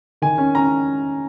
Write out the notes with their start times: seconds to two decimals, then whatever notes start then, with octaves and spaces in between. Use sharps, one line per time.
0.22 D#3 G#5
0.38 C#4
0.55 C#4 A#5